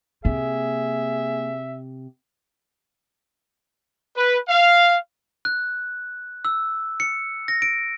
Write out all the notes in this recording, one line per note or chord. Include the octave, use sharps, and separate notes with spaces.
C3 A#3 C4 G#4 E5
B4
F5
F#6
E6
C#7
A#6
D7